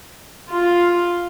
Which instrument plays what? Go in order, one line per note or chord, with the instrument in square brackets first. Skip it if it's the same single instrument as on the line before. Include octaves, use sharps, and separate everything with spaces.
[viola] F4